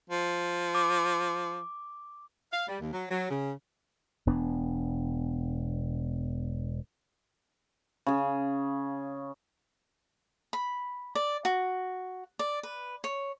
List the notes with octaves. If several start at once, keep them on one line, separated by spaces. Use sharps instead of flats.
F3
D6
F5
G3
D#2
F#3
F#3
C#3
E1 B3 D4
C#3 G#4
B5
D5
F#4
D5
B4
C#5